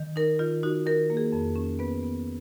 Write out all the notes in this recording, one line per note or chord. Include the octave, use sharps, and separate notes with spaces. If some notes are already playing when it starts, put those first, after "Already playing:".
Already playing: D#3
D#4 A#4
D#3 F4
D#4 F#4
D#3 A#4
A#3
G#4
F2
C#4
B3 B4
B3